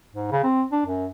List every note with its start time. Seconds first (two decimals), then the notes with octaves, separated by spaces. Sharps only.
0.13 G#2
0.32 C#3
0.43 C4
0.72 D4
0.86 F#2